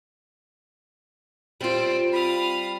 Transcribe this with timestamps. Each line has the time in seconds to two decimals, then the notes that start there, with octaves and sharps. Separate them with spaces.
1.61 G3 C4 F4
2.13 F5 B5 D#6